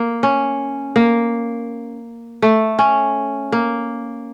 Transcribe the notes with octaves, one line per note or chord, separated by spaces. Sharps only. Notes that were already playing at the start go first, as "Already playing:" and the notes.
Already playing: A#3
C#4
A#3
A3
C#4
A#3